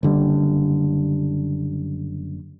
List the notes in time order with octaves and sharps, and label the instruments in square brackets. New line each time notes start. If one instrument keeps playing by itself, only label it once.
[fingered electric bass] F#1 D3 G3